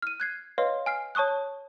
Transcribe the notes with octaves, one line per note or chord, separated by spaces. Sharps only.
F6 D#7
F#6 G#6 C7
B4 C#5 D#5 F5 C6
G#5 F6 C7
C#5 A5 C#6 D#6 F#6